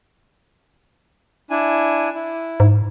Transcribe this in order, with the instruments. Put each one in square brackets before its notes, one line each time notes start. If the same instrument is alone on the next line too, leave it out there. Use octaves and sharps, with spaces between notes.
[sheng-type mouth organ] D4 E4 G#5
E4
[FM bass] G#2